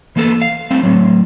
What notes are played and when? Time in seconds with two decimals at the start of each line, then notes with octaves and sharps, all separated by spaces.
0.16 E3 A#3 B3 A4
0.42 F5
0.71 G3 A3 C4
0.83 A2 F#3